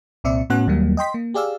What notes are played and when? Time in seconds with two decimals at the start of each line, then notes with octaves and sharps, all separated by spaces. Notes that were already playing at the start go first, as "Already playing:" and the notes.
0.24 C2 A#2 C4 D5 E5 C#7
0.50 A2 B3 C#4 F#4 F#5 F#6
0.67 D#2 F#3 G3 A#3
0.97 D#5 G5 C6 B6
1.14 A#3
1.34 G4 G#4 D5 F5 E6